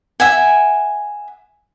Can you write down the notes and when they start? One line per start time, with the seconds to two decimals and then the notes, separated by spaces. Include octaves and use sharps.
0.20 E5 F#5 G#5